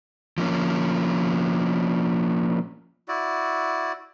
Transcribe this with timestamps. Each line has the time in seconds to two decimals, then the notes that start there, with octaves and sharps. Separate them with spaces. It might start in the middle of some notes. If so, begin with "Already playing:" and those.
0.38 F3 A#3 C#4
3.08 E4 F#4 D5